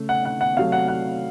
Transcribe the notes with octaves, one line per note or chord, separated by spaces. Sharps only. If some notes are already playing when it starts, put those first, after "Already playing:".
Already playing: C#3 A3
F#5
F#5
F#5
C3 F#3 A3 F5
F#5
F#5